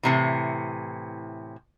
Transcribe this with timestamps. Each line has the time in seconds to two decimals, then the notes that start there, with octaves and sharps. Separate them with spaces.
0.03 A2 C3 E3